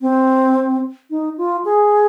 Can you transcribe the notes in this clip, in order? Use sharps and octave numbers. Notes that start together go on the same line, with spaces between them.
C4
D#4
F4
G#4